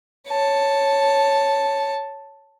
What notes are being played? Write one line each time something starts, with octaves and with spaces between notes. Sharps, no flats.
C#5 A5